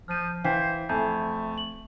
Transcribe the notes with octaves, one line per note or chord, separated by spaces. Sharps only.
F3 F6 G6 D#7
E3 C5 F5 G5 B6
F2 A3 E5 G#5 G6
F#7